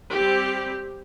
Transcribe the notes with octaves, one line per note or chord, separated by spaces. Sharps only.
G3 C4 G4